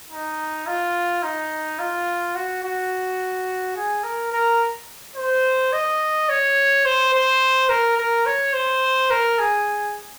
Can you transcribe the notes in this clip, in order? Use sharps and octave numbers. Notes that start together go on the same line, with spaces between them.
D#4
F4
D#4
F4
F#4
F#4
G#4
A#4
A#4
C5
D#5
C#5
C5
C5
A#4
A#4
C#5
C5
A#4
G#4